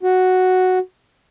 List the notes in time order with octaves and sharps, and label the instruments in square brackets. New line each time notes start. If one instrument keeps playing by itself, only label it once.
[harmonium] F#4